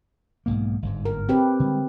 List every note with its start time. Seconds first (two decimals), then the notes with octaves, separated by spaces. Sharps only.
0.46 B1 G#2 A#3
0.82 G1 G#2
1.05 A#4
1.29 C4 G4 B4
1.60 D3 G3 G#3